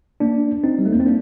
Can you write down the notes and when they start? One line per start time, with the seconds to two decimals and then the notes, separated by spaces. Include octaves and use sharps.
0.20 A#3 D4
0.64 C4 D#4
0.79 G3
0.85 A3
0.92 A#3
1.00 C4
1.06 A#3 D4